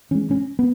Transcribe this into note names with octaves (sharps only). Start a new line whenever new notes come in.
E3 G#3 C#4
C#4
B3